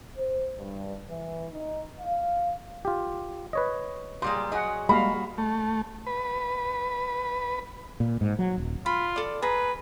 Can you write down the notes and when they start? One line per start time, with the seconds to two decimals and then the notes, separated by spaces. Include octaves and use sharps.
0.18 C5
0.58 G2
1.09 E3
1.52 D#4
2.01 F5
2.85 F4 G4
3.53 B4 C#5 D#5
4.22 A#2 G3 G#3 C6
4.52 F#3 G#4 D#5 F#5
4.89 G3 G#3 A#3 F#4 F5 B5
5.38 A3
6.07 B4
8.00 A#2
8.21 G#2
8.39 F#3
8.58 D#1
8.86 F4 B5
9.16 A4 D5
9.42 G#4 B4 A#5